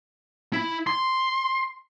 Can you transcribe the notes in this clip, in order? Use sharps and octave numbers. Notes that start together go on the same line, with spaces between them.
E4
C6